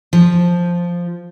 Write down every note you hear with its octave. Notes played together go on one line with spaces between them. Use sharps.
F3